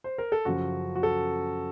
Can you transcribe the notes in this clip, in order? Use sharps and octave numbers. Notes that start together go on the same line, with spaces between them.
C5
A#4
A4
F#2 C#3 F3 F#4
F#4
A4